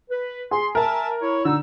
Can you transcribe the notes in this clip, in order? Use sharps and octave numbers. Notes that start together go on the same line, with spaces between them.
B4
G#4 C6
A#4 E5 G#5 A5
E4 C#5
D3 D#4 E6